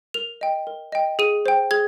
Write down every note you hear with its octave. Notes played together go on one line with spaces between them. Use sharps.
A#4 F7
D#5 G5
A#4
D#5 G5
G#4 D#7
C5 G5
G#4 G#6